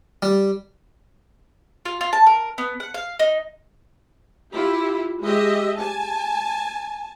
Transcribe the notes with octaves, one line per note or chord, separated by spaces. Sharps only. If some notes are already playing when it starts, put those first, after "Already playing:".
G3
F4
F4
A5
A#4
B3
F#5
F5
D#4
E4 F4 G4
G#3 G4 D#5 E5
G#5 A5